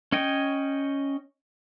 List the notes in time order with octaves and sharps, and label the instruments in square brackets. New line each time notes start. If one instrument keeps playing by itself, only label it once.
[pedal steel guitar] C#4 C#5 D#5 G5